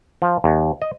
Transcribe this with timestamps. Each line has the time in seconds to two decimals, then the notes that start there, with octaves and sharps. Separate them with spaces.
0.22 F3
0.44 D#2
0.82 D#5